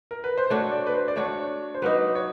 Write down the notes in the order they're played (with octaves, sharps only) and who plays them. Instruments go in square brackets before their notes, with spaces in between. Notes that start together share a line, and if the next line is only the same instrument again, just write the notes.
[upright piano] A#4
B4
C5
[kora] A3 D4 F#4 [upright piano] C#5
[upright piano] D5
B4
C5
D5
[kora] A3 D4 F#4 [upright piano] C#5
[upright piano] C5
[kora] F#3 A#3 D#4 [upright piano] B4
[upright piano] C#5